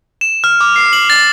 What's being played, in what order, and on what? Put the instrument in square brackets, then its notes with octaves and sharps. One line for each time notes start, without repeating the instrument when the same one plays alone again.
[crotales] E7
F6
D6
C7
F#7
A6